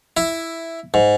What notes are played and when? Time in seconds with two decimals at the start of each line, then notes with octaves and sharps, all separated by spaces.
0.17 E4
0.94 G#2